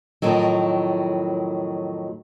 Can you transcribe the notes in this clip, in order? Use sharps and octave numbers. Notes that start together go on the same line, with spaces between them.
F2 A2 D#3 F#3